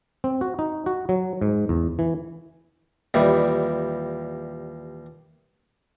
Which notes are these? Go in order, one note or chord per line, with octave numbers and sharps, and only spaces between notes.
C4
F#4
D#4
F#4
F#3
G#2
E2
E3
D#2 A#2 E3 G3